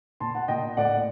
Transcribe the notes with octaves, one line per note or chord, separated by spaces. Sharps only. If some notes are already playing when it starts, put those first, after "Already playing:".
A#2 A5 C6
F#5 A5
A#2 D#5 G5
A2 D5 F#5